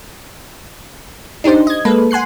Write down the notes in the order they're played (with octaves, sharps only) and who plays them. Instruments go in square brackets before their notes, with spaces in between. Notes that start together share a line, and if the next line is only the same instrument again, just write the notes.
[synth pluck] D4 D#4 G4 C5
D#5 G#6
G#3 A#3 A4 B4
F#5 G#5 C6 F#6 C7